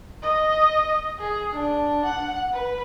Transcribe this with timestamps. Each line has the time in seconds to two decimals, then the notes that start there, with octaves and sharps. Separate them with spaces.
0.22 D#5
1.19 G#4
1.53 D4
2.05 F#5
2.53 B4